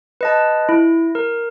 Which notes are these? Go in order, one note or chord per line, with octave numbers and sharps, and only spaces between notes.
B4 D#5 A5
E4
A#4